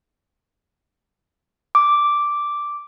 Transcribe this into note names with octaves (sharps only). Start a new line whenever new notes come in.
D6